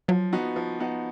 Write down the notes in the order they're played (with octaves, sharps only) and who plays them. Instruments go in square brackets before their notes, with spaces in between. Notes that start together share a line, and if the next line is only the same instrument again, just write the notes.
[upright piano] F3 [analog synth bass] F#3
[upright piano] B3 D#4 F#4
F3
B3 D#4 F#4